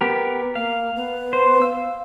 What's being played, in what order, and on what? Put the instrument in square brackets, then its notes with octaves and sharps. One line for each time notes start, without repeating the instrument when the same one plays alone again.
[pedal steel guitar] B3 G4 A#4
[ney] A#3 [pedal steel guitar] F5
[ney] B3
[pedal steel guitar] C5
[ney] F5 [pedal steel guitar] E6